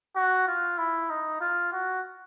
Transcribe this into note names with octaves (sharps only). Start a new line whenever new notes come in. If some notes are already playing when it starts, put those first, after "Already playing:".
F#4
F4
E4
D#4
F4
F#4